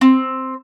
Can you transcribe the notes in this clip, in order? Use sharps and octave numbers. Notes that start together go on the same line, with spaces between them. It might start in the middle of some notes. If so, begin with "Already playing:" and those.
C4